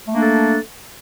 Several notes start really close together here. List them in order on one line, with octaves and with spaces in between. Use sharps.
A3 A#3 D4 A4